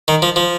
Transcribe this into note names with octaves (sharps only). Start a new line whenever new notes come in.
D#3
F3
F3